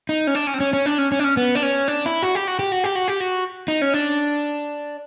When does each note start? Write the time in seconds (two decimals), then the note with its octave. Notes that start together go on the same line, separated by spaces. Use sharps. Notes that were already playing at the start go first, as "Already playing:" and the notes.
0.09 D#4
0.27 C#4
0.35 D4
0.47 C#4
0.54 C4
0.60 C#4
0.73 C#4
0.86 D4
0.98 C#4
1.12 C#4
1.19 D4
1.24 C#4
1.37 B3
1.55 D4
1.63 C#4
1.88 D4
2.06 E4
2.23 F#4
2.35 G4
2.48 F#4
2.59 G4
2.72 F#4
2.84 G4
2.95 F#4
3.08 G4
3.20 F#4
3.68 D#4
3.82 C#4
3.93 D4